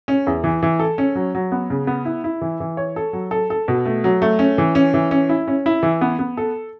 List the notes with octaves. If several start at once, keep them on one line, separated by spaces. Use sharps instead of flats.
C#4
E2
E3
E3
A4
C#4
F#3
F#3
B3
C#3
B3
E4
E4
E3
E3
C#5
A4
F#3
A4
A4
B2
A3
F#3
A3
C#4
E3
C#4
E3
C#4
E4
C#4
E4
E3
B3
B3
A4